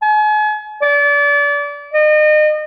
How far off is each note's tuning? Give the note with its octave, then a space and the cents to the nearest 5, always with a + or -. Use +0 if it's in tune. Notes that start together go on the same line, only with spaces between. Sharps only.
G#5 +40
D5 -30
D#5 -35